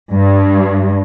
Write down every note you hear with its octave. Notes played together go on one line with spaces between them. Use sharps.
G2